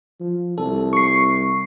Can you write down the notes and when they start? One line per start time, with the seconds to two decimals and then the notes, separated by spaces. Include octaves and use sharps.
0.20 F3
0.58 C2 A4
0.93 C#6 C7